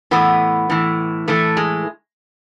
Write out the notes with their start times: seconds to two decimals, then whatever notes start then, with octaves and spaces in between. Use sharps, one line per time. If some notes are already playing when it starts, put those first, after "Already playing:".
0.11 A2 E3 B3
0.70 A2 E3
1.28 A2 E3 A3
1.57 G#3